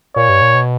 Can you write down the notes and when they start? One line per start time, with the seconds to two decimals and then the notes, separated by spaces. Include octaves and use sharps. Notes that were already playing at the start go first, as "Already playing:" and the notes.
0.16 A#2 C#5
0.29 G2
0.41 A#2
0.55 B2